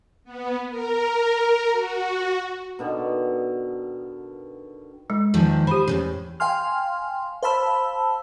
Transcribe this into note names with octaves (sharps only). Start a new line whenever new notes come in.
B3
A#4
F#4
B2 D3 D#3
G#3
E2 D#3 F3
G4 C5 B5
E2 A2 C#3
F5 G5 G#5 C6 F6
C5 F5 A5 B5 E6